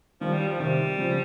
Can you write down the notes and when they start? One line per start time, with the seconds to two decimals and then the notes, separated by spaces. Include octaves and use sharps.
0.20 D#3 F3 G3
0.33 G3
0.47 F3
0.59 C3 D#3 G3
0.98 C#3 F3